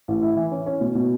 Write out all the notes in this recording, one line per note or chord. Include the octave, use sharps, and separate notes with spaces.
A1
E4
E3
C#4
C#4
B2
B2